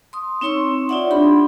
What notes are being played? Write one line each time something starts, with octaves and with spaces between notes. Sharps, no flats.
C6 D#6
C4 D#4 C#5 C6 C#6 E6
D#4 F4 D5 E5 F#5
D4 G4 B5 C6